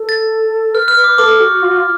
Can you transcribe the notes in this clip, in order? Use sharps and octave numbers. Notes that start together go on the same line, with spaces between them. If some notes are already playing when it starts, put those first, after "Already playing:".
Already playing: A4
A6
B4 F6
F6
D6
A4 D6
F#4
F4
F#4
F4